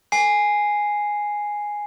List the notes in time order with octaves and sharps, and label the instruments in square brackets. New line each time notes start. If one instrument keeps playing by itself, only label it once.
[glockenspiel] G#5 C7